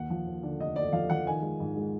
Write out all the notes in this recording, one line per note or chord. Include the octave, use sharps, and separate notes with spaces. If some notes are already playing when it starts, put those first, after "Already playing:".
Already playing: D#2 F#5
F3
D#2
D3
F1 D#5
D#2 D5
F3 F5
F3 F#5
D#3 G#5
G#3
G#2
G#3